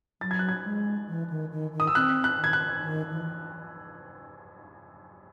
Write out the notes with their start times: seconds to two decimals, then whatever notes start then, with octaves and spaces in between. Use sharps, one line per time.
0.21 F#3 A6
0.31 G#6
0.39 F#6
0.49 G#6
0.65 G#3
1.08 E3
1.30 D#3
1.52 D#3
1.73 D#3
1.80 D#6
1.87 E6
1.95 C4 F#6
2.24 F#6
2.39 D#3 G#6
2.53 F#6
2.82 D#3
3.11 E3